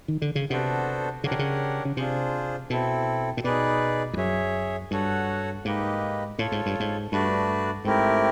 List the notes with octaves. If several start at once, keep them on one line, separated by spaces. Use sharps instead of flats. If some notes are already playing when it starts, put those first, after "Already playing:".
D#3
D3
C#3
C3 B3 D4 F#4 A4 C5
C#3 D4 G4 A#4 C#5 F#5
C3
C#3
C#3
C3 D4 F4 G#4 C5
B2 C4 E4 A4
A#2
B2 D#4 G#4 B4 D5
F2
F#2 G#4 C#5 E5
G2 F#4 A4 C#5 F#5
G#2 A#3 D#4 G4 B4 D#5
A2 F4 A4 C#5
G#2
G2
G#2
G2 A3 D4 F#4 B4 D5
G#2 A3 C4 E4 G4 A#4